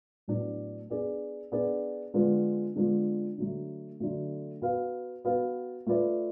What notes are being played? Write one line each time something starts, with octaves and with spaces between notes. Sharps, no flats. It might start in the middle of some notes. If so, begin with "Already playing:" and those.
A2 F#3 B3 D4
B3 D4 G#4 D5
B3 D4 G#4 D5
D3 G#3 B3 D4 F4
D3 G#3 B3 D4 F4
D3 F#3 A3
D3 F#3 A3
B3 F#4 B4 F5
B3 F#4 B4 F5
A3 F4 B4 D5